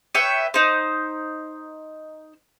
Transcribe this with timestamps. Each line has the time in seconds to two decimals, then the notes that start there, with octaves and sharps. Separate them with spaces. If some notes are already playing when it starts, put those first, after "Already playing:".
0.15 B4 C#5 E5 G5
0.54 D#4 C5